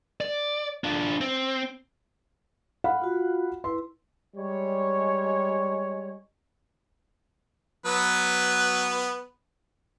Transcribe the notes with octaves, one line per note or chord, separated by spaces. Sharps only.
D5
D4 F4
C4
F5 F#5 B5
F4 F#4
E4 B4 C6
G3 G#3 C#5
F#3 B3 B4